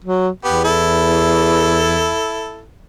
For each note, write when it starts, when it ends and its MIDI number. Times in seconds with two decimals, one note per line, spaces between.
0.04 0.29 54
0.44 2.16 40
0.44 0.62 59
0.44 0.62 67
0.64 2.62 64
0.64 2.62 69